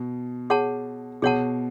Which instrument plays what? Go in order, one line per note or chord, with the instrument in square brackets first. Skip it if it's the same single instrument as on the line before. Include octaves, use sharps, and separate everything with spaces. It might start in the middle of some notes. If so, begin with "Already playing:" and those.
Already playing: [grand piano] B2
[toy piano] G#4 C#5 F#5 A5
[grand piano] B2 [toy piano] G#4 C#5 F#5 A5